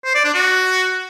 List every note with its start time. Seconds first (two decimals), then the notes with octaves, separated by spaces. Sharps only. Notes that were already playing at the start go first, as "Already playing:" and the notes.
0.05 C5
0.15 D5
0.25 D4
0.34 F#4